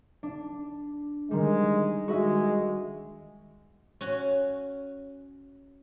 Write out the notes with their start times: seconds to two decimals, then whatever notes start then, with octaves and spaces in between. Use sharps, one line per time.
0.23 D4
1.31 D#3 G3 G#3
2.08 G#3 F#4 D#5 E5
4.01 C#4 F#4